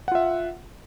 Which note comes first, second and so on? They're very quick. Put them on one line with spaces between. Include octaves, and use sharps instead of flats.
F#5 F4 E5